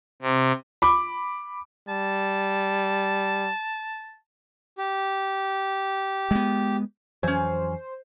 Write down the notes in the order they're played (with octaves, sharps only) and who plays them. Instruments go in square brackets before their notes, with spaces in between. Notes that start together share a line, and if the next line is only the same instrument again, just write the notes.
[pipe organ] C3
[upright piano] B5 D6
[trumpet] G3 [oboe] A5
[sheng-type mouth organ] G4
[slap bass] G#3 B3
[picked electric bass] F2 E3 F#3 [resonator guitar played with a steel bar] C#4 G#5 [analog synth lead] C5